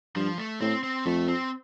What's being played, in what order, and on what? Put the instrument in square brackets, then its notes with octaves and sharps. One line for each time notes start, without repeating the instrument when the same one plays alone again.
[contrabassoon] G2 [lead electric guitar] F3
[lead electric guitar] A3
[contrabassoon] A2 [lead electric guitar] C4
[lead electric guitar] C4
[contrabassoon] F2 [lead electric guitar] A3
[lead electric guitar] C4